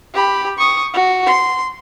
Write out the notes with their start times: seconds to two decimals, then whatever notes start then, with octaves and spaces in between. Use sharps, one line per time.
0.14 G4 B5
0.58 C#6 D#6
0.93 F#4
1.27 C6